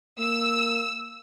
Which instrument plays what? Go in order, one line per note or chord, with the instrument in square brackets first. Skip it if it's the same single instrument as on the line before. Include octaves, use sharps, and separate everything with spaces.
[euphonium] A#3 [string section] E6